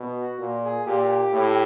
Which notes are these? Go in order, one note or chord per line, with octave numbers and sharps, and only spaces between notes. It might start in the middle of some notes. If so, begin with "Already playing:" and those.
Already playing: B2
F#4
A#2
G#4
A#2 G4
A2